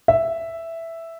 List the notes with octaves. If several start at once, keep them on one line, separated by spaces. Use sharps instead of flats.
E5